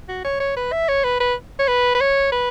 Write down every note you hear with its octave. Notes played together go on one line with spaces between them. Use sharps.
F#4
C#5
C#5
B4
E5
C#5
B4
B4
C#5
B4
B4
C#5
B4